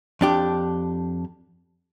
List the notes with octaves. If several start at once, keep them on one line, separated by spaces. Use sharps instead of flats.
F2 D4 G4